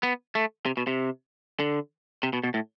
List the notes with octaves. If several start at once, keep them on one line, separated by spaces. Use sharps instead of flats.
B3
A3
C3
B2
C3
D3
C3
B2
B2
A2